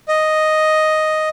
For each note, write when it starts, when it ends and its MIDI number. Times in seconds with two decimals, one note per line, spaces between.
0.08 1.29 75